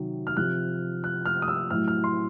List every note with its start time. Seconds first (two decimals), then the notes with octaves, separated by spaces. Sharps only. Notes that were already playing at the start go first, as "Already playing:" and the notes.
Already playing: C3 D#3 F#3
0.27 F6
0.37 C3 F3 F#6
1.04 F#6
1.25 F6
1.42 D#6
1.48 E6
1.70 A2 F#3 F6
1.88 F6
2.04 C6